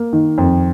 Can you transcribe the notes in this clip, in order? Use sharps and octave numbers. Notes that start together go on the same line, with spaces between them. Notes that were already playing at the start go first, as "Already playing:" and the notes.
Already playing: A#3
D#3
F2